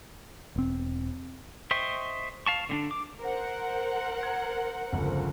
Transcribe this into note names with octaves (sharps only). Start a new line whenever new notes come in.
E1 C4
C5 D#5 E5 G5 C#6
F5 A5 C#6
D3 C4 D4
D6
A#4 C5 F#5
G#6
G1 C#2 F3